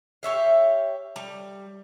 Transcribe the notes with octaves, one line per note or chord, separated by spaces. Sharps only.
G4 C#5 E5 F5
G3